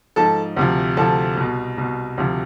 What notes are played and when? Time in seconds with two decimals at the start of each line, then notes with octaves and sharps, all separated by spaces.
0.16 G#2 F3 A4 A5
0.56 D2 C3 F3
0.97 D2 C3 F3 A4 A5
1.37 C2 B2
1.78 C2 B2
2.18 D2 C3 F3